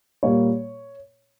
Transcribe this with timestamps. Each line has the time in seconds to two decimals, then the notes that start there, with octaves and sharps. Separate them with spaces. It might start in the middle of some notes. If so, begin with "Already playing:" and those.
0.23 A#2 G3 A#3 C#5